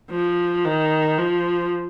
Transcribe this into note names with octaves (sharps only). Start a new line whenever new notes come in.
F3
D#3
F3